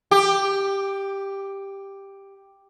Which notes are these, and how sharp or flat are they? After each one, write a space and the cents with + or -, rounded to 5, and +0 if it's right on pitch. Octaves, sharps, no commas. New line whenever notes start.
G4 +5